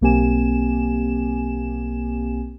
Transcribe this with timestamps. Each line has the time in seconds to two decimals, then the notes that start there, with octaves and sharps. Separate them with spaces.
0.01 B1 A#3 C4 G4 G#5 E7